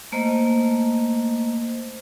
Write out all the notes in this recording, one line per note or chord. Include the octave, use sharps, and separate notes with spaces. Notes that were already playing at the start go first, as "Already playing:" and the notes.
A3 A#3 C5 D#5